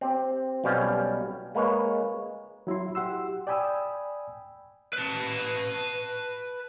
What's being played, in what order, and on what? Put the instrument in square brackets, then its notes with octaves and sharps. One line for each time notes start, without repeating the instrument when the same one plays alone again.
[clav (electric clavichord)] C4 G4
B1 B2 G3 C#4 F5
G#3 A#3 B4 C#5
[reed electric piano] F#3 E4 F#4 C6
G4 F#5 C6 E6
D5 G5 G#5 B5 D#6 E6
[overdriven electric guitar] B4 A5